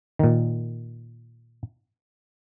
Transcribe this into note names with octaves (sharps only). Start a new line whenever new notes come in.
A#2 D#3